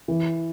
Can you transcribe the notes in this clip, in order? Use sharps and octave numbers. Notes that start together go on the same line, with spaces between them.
E3